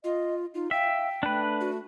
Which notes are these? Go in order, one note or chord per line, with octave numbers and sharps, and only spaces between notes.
F4 D#5
D#4 F4
E5 F5 G5
A3 D4 B4
F#4